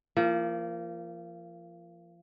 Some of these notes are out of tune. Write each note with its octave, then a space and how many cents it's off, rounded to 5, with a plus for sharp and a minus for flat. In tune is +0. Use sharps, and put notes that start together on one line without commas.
F3 -30 A#3 -5